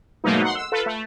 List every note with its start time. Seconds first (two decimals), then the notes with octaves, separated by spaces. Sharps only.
0.24 G#2 B2 F#3 A3 A#3 D#4
0.42 F#5 C6
0.55 E6
0.72 F4 A4 B4
0.86 A3